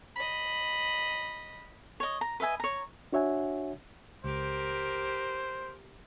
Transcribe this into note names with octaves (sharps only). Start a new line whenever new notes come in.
D#5 B5
C#5 D#5
A#5
B4 D#5 E5 G#5
C#5 A#5
D4 F#4 C#5 E5 F#5 G#5
C#2 G4 A#4 C5